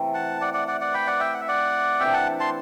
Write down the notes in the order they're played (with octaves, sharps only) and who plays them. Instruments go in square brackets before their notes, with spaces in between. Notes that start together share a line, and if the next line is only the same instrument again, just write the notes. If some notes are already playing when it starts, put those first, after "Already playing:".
Already playing: [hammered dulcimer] C3 E3 A3
[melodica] F#5 A5
D5 F#5
D5 F#5
D5 F#5
D5 F#5
G5 B5
D5 F#5
E5 G5
F#5
E5
D5 F#5
[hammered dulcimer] C3 E3 A3 D4 [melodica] E5 G5
[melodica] F#5 A5
A5 C6